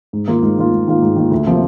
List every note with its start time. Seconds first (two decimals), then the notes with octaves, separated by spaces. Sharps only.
0.13 G#2
0.28 D#3 A#3 F4
0.43 G#2
0.58 D#3 A#3 F4
0.72 G#2
0.88 D#3 A#3 F4
1.02 G#2
1.16 D#3 A#3 F4
1.31 D2
1.47 C3 F3 A#3 F4